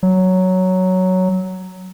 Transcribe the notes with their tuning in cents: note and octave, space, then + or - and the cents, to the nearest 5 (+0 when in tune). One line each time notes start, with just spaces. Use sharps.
F#3 +5